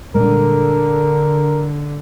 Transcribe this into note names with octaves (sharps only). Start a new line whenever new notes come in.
A#2 D3 G3 G#3 A#4